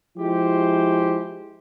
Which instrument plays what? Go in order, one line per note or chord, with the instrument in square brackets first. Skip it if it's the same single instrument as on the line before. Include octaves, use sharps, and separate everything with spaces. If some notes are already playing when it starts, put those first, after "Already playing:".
[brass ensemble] F3 G#3 E4 G4 C5